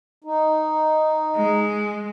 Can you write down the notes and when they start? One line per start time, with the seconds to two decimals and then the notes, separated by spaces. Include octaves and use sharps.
0.24 D#4
1.36 G#3